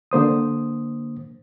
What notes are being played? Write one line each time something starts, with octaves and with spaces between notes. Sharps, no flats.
D3 A#3 C5 D#6